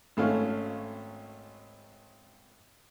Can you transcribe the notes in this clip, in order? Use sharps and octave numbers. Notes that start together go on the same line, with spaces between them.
G#1 A3 C#4 F5